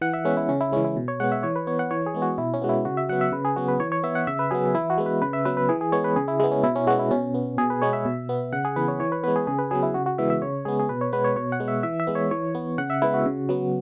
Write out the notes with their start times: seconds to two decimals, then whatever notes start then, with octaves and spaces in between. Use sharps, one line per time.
0.01 E3 F#5
0.14 E5
0.25 G#3 B3 C#4
0.37 E4
0.49 C#3 C#4
0.61 E4
0.72 E3 G#3 C#4
0.85 E4
0.96 B2
1.08 C#5
1.20 G#3 B3 F#5
1.32 E5
1.43 E3 C#5
1.56 B4
1.67 B3 C#5
1.79 F#5
1.91 E3 C#5
2.06 G#4
2.14 G#3 B3
2.22 F#4
2.38 B2 E4
2.54 C#4
2.62 G#3 B3 F#4
2.69 E4
2.85 C#3 F#4
2.97 E5
3.09 F#3 B3 F#5
3.21 E5
3.32 C#3 B4
3.45 G#4
3.56 F#3 B3 F#4
3.68 B4
3.80 E3 C#5
3.92 C#5
4.03 B3 E5
4.15 F#5
4.27 C#3 E5
4.39 B4
4.51 F#3 B3 G#4
4.75 E3 E4
4.90 F#4
4.98 G#3 B3
5.06 B4
5.22 C#3 B4
5.33 E5
5.45 F#3 B3 B4
5.57 B4
5.69 E3 G#4
5.81 G#4
5.92 G#3 B3 C#5
6.04 B4
6.16 C#3 G#4
6.28 E4
6.40 G#3 B3 E4
6.52 C#4
6.63 B2 E4
6.75 C#4
6.87 G#3 B3 F#4
6.99 E4
7.11 B2 C#4
7.34 B3
7.58 B2 G#4
7.70 B4
7.82 G#3 B3 C#5
7.93 E5
8.05 B2
8.29 B3
8.52 C#3 F#5
8.65 G#4
8.76 E3 B3 B4
8.88 C#5
9.00 E3 C#5
9.12 B4
9.24 G#3 B3 B4
9.36 G#4
9.47 C#3 G#4
9.59 B4
9.71 F#3 B3 G#4
9.83 E4
9.94 C#3 F#4
10.06 F#4
10.18 E3 G#3 B3 E5
10.30 E5
10.42 C#3 C#5
10.65 G#3 B3 G#4
10.79 G#4
10.89 B2 B4
11.01 C#5
11.13 G#3 B3 B4
11.24 C#5
11.36 B2 C#5
11.52 F#5
11.60 G#3 B3
11.68 E5
11.83 E3 E5
12.00 E5
12.07 G#3 B3
12.15 C#5
12.31 E3 C#5
12.55 B3
12.78 C#3 F#5
12.90 E5
13.02 G#3 B3 E4
13.14 F#4
13.25 C#3
13.49 F#3 B3